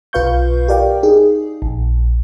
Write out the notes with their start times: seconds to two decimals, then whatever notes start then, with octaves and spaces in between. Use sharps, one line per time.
0.13 B1 F4 B4 F5 C#6 G6
0.68 G4 A#4 D5 F5 G5
1.03 D#4 G#4
1.62 A#1